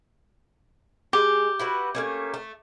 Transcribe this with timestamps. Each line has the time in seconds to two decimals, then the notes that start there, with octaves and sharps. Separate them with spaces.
1.13 G#3 G4
1.59 E4 F#4 B4
1.95 A3 A#3 C#4
2.34 A3